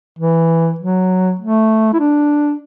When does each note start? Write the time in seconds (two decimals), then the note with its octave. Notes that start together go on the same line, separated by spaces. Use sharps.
0.19 E3
0.79 F#3
1.39 A3
1.93 E4
1.99 D4